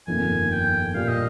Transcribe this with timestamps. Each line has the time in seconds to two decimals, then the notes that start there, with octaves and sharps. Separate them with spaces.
0.07 G1 F2 D#3 A#3 G#5
0.51 G5
0.94 A#2 G3 A#3 F4 F5
1.08 D#5